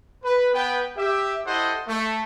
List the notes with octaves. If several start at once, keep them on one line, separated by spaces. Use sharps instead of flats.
B4
B3 B4 G5
G4 E5
E4 G4 A4 C5 D#5 F#5
A3